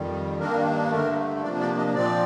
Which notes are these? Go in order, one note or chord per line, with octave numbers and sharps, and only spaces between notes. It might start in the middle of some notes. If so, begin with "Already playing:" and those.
Already playing: F2 D#3 G3
G2 D#3 A#3 D4 A#4
G2 D3 A3 A#4
C3 F3 A#3 D4 D5
D5
D#5
A#2 F3 C4 D5